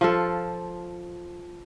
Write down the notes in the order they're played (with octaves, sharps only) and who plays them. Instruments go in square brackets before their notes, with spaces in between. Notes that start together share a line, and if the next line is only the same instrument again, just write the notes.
[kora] F3 F4 A4